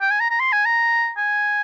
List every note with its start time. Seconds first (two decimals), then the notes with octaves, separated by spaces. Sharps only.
0.01 G5
0.11 G#5
0.20 A#5
0.30 A#5
0.40 C6
0.52 G#5
0.65 A#5
1.17 G#5